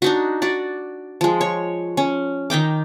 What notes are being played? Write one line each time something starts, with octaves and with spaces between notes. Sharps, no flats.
D4 D#4 F#4
F#4 D5
F3 G#3
C#5
C#4
D#3 D#4 G5 D6